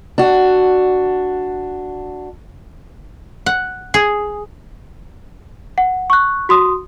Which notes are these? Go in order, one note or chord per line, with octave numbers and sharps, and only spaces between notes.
D4 F#4
F#5
G#4
F#5
C#6 F#6
F#4 C6 D#6